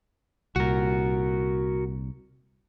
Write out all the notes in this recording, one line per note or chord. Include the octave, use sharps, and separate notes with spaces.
C2 A#2 F#4 A#4